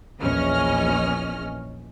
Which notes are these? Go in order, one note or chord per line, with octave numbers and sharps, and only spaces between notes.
A#1 E2 C#4 D#5 F6